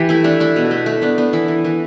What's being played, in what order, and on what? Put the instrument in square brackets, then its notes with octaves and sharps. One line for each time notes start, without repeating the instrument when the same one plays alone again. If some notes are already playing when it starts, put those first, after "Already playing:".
Already playing: [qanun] E3 G4
A3 E4
A3 D4
A3 E4
B2
A3
A3
B3 D4
B3 D4
E3 E4
E3
E3